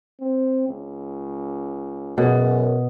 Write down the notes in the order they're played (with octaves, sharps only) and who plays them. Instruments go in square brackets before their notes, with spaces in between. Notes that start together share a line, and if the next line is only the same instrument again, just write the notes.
[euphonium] C4
C#2
[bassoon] F#2 [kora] B2 [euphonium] G#4